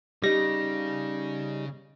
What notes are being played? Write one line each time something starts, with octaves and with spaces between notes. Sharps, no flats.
C#3 G3 D#4 G4 A#6